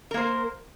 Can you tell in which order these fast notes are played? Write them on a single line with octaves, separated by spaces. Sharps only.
A#4 A#3 C5